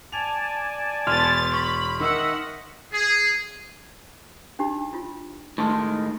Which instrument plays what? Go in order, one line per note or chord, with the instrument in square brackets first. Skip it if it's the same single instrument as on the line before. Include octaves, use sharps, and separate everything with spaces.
[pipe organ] D5 G#5 A5 [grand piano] F7
[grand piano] E1 [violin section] B3 A6 [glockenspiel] C6 F6 F7
[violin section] B5 [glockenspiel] C#6
[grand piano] D#3 [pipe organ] D#5 E5 E6 [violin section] F#5
[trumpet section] G#4
[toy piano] D4 D#4 G4
E4 F4
[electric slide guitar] A2 D#3 G#3 [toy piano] D#4 A5 C6